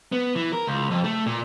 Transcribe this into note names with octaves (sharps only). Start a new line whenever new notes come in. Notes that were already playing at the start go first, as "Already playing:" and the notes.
B3
E3
A#4
C#2
F2
A3
A#2